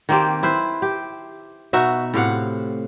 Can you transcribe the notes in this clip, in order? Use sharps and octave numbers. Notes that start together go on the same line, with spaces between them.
D#3 A#3 C4 G4
E4 B4 C5
G4
B2 D#4 F#4 E5
A2 C3 F5 F#5